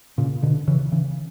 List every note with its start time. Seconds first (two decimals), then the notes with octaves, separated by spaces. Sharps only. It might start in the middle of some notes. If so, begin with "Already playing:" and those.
0.18 A#2 C#3
0.43 B2 D3
0.68 C#3 E3
0.92 C#3 E3